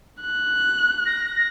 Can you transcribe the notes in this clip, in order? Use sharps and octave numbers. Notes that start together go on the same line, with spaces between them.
F#6
A#6